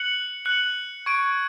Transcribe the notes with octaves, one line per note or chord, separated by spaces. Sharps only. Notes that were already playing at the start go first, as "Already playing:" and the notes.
Already playing: F#6 C#7 F#7
F#6 C#7 F#7
C#6 G#6 D7